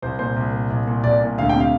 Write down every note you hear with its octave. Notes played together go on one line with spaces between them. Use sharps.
C2 C5
A#2 C5
C2
A#2
C2
A#2
C2 D5
A#2
D2 F5
G5
C3
F5